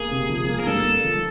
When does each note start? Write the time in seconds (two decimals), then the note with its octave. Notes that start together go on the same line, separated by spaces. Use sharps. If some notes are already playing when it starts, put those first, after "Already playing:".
Already playing: A#3 G#4
0.11 C3
0.29 F3
0.49 A#3
0.59 A#4
0.66 G2 A4
0.85 A#3
1.04 F3